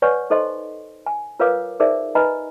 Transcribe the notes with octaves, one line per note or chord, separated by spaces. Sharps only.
B4 C#5 D5 F#5 G#5 C#6
D#4 A4 C5 D#5 C6
G#5
F4 A#4 B4 C#5 F5 D6
D#4 G#4 A#4 C5 D5 E5
D#4 B4 D#5 G#5 A#5 B5